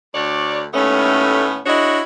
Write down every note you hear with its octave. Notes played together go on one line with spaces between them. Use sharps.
D2 C#5 D5
D#2 A2 A3 B3 C#4
D4 E4 F#4 G#4 C#5 D#5